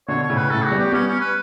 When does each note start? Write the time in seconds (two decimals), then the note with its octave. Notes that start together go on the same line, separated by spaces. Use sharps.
0.08 B2 D3 C#5
0.23 C#5
0.29 A2 C#3
0.37 B4
0.50 A2 C#3 A4
0.64 F#4
0.71 G3 B3
0.78 G4
0.92 G3 B3 C#4
1.07 C#4
1.20 B4